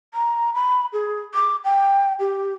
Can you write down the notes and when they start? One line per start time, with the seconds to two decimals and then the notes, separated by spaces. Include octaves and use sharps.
0.14 A#5
0.55 B5
0.93 G#4
1.35 D6
1.64 G5
2.20 G4